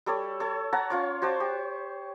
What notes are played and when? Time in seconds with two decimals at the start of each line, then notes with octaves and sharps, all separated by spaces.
0.06 G3 A4 C#5 D5
0.40 A4 C#5
0.73 C#5 F#5 A5 A#5
0.90 C#4 F4 C#5
1.22 F#4 C5 C#5 A5
1.40 G4